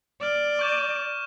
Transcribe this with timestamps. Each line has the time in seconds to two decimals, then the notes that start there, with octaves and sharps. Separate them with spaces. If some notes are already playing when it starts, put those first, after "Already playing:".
0.21 D5 D6 F6
0.59 C#6 G6 E7